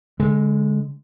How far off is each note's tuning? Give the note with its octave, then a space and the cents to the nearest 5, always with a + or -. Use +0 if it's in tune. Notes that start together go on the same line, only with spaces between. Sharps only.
D3 -30 G#3 +0